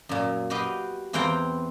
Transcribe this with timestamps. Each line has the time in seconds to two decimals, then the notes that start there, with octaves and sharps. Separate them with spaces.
0.09 F#2 A#2
0.50 F#4 G4 B4 D#5 F5
1.13 E2 E3 C4 F5 G5 A#5